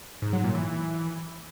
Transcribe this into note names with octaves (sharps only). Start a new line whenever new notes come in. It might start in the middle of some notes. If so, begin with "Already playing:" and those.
G#2
F#3
A#2
E3